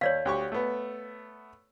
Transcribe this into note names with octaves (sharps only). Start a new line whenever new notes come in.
D#2 C#5 D5 F5
D2 G4 C#6
A3 B3